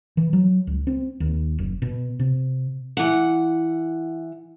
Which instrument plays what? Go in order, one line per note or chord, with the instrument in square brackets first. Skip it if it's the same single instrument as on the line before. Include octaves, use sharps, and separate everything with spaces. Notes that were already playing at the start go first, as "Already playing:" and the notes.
[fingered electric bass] E3
F#3
C#2
C4
D#2
F#1
B2
C3
[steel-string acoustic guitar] E3 F#5